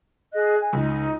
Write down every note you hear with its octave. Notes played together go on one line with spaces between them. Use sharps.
G#4 D#5 F#6
G#5
C#2 D#4